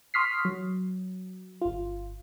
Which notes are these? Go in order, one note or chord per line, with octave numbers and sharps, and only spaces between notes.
C6 C#6 D#6 F6 B6 C7
F#3
G1 F4